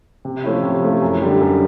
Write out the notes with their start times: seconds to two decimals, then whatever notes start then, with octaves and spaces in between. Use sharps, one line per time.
0.25 C3
0.43 F3 A3 C#4 E4
0.63 C3
0.83 F3 A3 C#4 E4
1.02 F#2
1.22 D3 G3
1.41 F#2